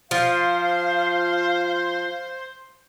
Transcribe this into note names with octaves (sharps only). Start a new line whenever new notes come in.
F3 C5 F5